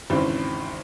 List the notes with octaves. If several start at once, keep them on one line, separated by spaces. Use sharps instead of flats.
G#1 E2 C#3 C4